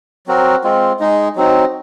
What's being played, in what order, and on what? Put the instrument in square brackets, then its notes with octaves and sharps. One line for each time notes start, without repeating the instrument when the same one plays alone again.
[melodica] F#3 C4 F#4 A#4
G#3 C4 F4
G#3 D#4 G#4
F#3 C4 D#4